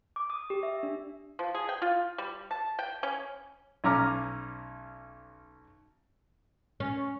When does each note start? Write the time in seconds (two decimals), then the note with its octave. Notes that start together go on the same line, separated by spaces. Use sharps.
0.16 D6
0.30 D#6
0.50 G4
0.63 E5
0.83 D4
1.39 F3
1.55 G#4
1.69 G5
1.82 F4
2.18 G3
2.51 A5
2.79 G5
3.03 C#4
3.84 B1 C#4 A#5 D6 F6
6.80 C#4